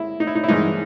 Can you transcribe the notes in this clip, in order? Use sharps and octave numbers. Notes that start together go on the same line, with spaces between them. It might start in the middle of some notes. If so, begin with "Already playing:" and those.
Already playing: G#3 E4
D#4
E4
D#4
E4
G2 E3 G#3 D#4